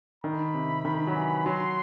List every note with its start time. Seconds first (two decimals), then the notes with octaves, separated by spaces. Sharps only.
0.24 D#3 B5
0.54 C3
0.85 D#3
1.07 F#3
1.15 E3
1.45 F#3 C6